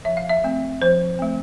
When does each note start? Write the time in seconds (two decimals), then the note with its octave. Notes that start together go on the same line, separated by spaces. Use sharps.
0.05 F3 E5
0.17 F5
0.29 E5
0.44 A3 C4
0.82 F3 C5
1.19 A3 C4